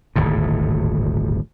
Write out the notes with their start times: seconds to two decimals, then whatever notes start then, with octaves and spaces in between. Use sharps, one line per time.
0.16 D#1 G#1 D2 A2